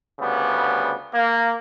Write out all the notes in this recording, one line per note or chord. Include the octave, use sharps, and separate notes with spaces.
D2 C#3 G3 B3
A#3